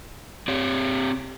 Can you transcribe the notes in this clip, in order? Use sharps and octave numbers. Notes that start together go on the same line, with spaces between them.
C4 G4 C#5